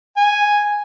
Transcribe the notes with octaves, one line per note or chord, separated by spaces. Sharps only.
G#5